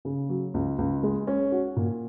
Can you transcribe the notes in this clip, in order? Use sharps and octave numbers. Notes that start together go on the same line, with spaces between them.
C#3
F#3
C#2
C#2
G#3
C#4
F#4
A#2